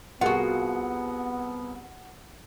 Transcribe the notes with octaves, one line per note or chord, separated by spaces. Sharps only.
C2 B3 F4 F#4 G#4 A#4 F#5